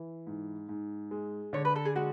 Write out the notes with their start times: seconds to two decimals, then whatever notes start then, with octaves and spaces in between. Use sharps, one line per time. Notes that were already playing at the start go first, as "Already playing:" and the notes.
Already playing: E3
0.27 G#2
0.69 G#2
1.11 G#3
1.53 D3 C#5
1.65 B4
1.76 A4
1.85 G#4
1.96 G#3 F#4